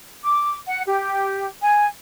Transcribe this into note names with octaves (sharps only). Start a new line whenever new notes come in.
D6
F#5
G4
G#5